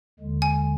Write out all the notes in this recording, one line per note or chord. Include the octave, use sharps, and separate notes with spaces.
D#2 D3 G#3
G#5